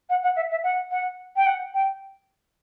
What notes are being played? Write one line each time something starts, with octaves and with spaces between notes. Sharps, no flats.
F#5
F#5
E5
E5
F#5
F#5
G5
F#5
G5